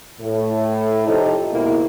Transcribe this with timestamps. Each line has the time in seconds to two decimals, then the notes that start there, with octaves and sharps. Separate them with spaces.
0.21 A2
1.07 C3 F3 D#4 A4 C5
1.51 D#2 G#2 B2 A#3 E4